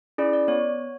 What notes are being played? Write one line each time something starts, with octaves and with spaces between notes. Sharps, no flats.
C#4 E4 G#4 D5
D5
B3 C#5